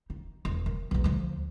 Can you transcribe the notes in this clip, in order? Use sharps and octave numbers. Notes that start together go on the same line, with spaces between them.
D#4
E1
D#3
B1 E2
D2 F3